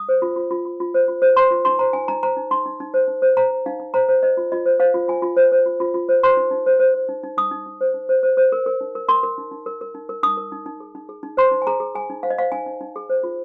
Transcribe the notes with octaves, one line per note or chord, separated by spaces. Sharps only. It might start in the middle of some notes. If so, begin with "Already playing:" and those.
Already playing: D#6
C5
F4
F4
F4
F4
F4
C5
F4
C5
C5 C6
F4
D#4 C6
C5 A#5
D#4 G#5
D#4 A#5
C5 A#5
D#4
D#4 C6
D#4
D#4
C5
D#4
C5
C5 A#5
C5
D#4 F5
D#4
C5 A#5
C5
C5 D#5
F4
F4 D#5
C5
C5 F5
F4
F4 G#5
F4
C5
C5
F4
F4
F4
C5
C5 C6
D#4
D#4
C5
C5
C5
D#4
D#4
D#4 D#6
D#4
D#4
C5
D#4
C5
C5
C5
A#4
A#4
D#4
A#4
A#4 C6
A#4
D#4
D#4
A#4
A#4
D#4
A#4
D#4 D#6
A#4
D#4
D#4
G#4
D#4
G#4
D#4
C5 C6
D#4
G#5
G#4 A#5
G#4
G#4 G#5
D#4
C5 F5
D#5
C5 F5
D#4 G#5
D#4
D#4
G#4
C5
F4